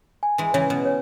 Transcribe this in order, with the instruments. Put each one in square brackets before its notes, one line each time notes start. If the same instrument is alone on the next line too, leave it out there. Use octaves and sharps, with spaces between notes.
[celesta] G#5
[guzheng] E3 G#3
[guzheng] C#3 E3 [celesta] C#5
[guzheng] B2
[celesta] C#5